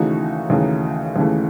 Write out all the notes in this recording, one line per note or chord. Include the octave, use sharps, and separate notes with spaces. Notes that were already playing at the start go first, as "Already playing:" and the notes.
Already playing: D#2 C#3 E3 A3 D#4 F#4
D#2 C#3 E3 A3
D#2 C#3 E3 A3